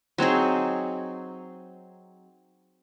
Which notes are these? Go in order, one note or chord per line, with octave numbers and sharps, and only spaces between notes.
F#3 C4 D#4 G#4